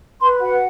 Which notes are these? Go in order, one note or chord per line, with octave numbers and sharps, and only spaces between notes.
B4 C6
F#4 F#5